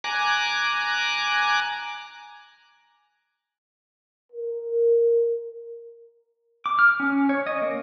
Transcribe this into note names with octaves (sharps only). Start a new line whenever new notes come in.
G#5 A#5 D6 F#6
A#4
D6
F6
C#4
C#5
D#5
A#3